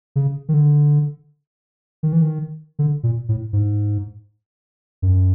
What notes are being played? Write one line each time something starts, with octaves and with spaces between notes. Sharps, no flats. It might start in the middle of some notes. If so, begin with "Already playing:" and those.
C#3
D#3
D3
D#3
E3
D#3
D3
A#2
A2
G#2
F#2